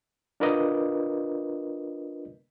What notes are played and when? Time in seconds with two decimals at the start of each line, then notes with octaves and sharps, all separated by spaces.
0.40 D4 F4 A#4 B4 D5 D#5